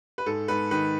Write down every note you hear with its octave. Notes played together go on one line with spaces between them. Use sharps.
B4
G#2 A4
G#2 B4
D#3 B4